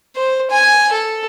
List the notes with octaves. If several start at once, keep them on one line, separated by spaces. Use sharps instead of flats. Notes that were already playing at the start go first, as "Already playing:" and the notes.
C5
G#5
A4